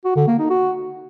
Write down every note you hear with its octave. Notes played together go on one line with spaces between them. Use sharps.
F#4
D3
A#3
D#4
F#4